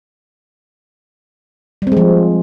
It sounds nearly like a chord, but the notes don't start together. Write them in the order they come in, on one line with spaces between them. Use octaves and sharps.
G3 C4 G#3 F3